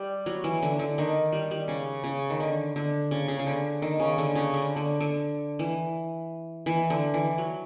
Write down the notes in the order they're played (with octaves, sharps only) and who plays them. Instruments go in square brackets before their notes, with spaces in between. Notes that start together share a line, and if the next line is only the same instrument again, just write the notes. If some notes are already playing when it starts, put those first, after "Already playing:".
Already playing: [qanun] G3
F#3
E3
D3
D3
D#3
G3
G3
C#3
C#3
D#3
D3
D3
C#3
C#3
C#3
D3
D#3
C#3
D3
C#3
D3
D3
D3
E3
E3
D3
E3
F#3